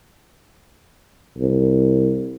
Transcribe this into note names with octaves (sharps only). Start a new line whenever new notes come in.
C2